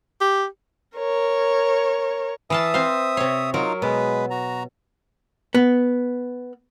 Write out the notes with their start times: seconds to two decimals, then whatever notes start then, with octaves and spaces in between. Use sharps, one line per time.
0.21 G4
0.97 A#4 C#5
2.50 E3 E5 F5 A5 D#6
2.74 C4 C5 F5
3.17 C3 C#5
3.54 F#3 D#4 F4 A#4 F5
3.82 B2 G#3 B4
4.30 F#4 A#5
5.55 B3